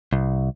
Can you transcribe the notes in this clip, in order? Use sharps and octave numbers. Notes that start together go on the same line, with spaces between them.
C2